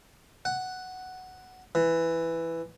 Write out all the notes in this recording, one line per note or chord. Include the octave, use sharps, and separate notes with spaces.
F#5
E3